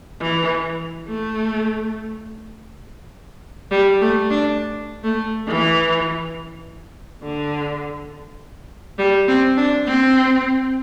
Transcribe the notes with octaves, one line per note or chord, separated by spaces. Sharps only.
E3
A3
G3
A3
D4
A3
E3
D3
G3
C4
D4
C4